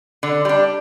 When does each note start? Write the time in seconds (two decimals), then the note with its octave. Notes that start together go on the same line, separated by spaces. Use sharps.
0.23 D3
0.45 G3 D4